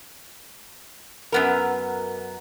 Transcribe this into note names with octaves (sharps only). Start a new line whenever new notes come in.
F#2 B3 A#4